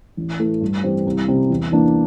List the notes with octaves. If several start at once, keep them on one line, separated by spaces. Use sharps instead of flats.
A1
A2 E3 A3
G2
E3 G3 C4 G4
C2
C3 G3
E2
E3 A#3 D4